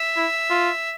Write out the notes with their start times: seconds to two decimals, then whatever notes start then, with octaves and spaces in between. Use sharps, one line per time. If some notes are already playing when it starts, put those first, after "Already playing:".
Already playing: E5
0.17 E4
0.50 F4